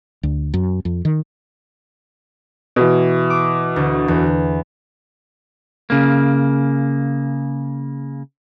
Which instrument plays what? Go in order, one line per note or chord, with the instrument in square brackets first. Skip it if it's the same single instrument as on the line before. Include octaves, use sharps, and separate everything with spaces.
[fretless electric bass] D2
F#2
F2
D#3
[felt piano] B2 E3
[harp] D6
D2
E2
[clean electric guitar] C#3 A#3